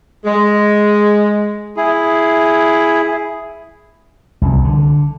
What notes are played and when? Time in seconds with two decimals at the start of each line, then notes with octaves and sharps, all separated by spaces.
0.25 G#3
1.77 E4 G#4
4.42 C2
4.65 D3